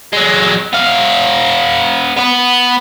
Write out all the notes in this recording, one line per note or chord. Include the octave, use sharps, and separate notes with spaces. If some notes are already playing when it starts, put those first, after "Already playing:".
F#3 G#3
B3 F5
B3 B4